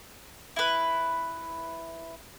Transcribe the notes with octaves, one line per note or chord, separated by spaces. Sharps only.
E4 B4